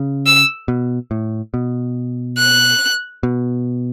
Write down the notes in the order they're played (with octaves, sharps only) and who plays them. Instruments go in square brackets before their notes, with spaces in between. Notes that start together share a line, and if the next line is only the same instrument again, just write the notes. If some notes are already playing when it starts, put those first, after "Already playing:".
Already playing: [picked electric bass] C#3
[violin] E6
[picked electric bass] B2
A2
B2
[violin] F#6
[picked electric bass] B2